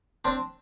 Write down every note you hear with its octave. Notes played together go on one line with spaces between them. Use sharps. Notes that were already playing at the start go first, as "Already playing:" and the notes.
C4 D4